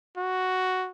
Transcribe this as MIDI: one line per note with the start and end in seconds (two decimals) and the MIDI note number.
0.17 0.90 66